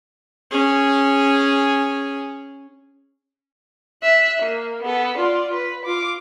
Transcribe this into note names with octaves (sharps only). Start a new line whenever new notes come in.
C#4 G#4
E5 F#6
A#3
B3 A4
F4 D5
B4
F4 D6